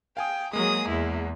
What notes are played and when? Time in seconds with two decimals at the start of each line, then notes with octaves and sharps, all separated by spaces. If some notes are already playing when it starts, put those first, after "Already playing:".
0.17 F5 G5 G#5 D#6
0.53 F#3 G#3 A#3 G#4 D#6
0.87 E2 E4